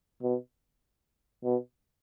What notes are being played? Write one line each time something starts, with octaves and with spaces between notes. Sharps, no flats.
B2
B2